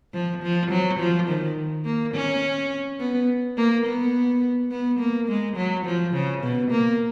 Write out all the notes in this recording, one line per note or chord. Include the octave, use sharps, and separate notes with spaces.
F3
F3
F#3
F3
D#3
A#3
C#4
B3
A#3
B3
B3
A#3
G#3
F#3
F3
C#3
B2
A#3